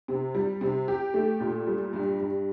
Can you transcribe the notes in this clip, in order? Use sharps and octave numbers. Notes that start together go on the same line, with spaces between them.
C3
G3
C3
G4
A3
A#2
G3
G2
G2